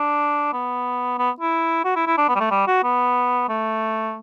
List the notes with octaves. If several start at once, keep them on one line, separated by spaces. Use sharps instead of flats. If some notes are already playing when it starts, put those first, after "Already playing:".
Already playing: D4
B3
B3
E4
F#4
E4
E4
D4
B3
G3
A3
G3
F#4
B3
A3